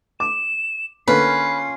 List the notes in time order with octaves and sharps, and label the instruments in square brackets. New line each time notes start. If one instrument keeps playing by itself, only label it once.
[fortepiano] D6 [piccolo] E7
[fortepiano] D3 A#3 [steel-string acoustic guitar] C#4 F4 [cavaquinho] B4 [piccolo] C7